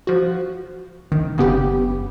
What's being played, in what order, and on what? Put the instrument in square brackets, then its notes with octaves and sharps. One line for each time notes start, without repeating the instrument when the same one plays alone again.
[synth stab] F3 F#4
[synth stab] D#3 [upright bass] D4
[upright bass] F#1 D4 [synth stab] C#3 B3 G4